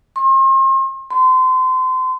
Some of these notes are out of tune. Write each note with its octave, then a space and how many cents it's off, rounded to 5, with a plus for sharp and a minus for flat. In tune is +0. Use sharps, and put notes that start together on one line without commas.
C6 +40
C6 -30